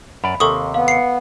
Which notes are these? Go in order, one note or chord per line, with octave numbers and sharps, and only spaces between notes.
F#2 D5 B5
D#2 C3 A4 C#6 D#6
B3 F5
C7 C#7